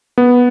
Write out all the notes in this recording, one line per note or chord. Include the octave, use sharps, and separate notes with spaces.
B3